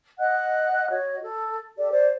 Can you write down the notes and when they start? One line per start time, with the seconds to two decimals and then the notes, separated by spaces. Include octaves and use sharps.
0.19 D#5 F#5 F#6
0.89 F#4 C#5 D#5
1.21 A4
1.77 G4 A4 D5
1.90 C5 D5